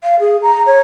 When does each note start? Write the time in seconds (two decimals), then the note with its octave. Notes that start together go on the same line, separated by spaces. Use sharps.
0.03 F5
0.20 G#4
0.42 A#5
0.66 C#5